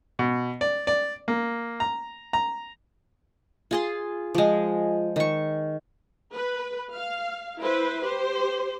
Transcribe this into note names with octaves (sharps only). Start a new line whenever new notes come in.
B2
D5
D5
A#3
A#5
A#5
F4 G#4 C6
F3 G#3
D#3 C#6
B4
F5
E4 B4 C5
G4 C5